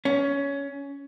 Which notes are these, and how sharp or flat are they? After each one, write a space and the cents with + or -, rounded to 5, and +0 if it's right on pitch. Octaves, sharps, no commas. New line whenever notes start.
C#4 +15